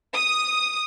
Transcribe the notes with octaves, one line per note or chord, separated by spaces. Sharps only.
D#6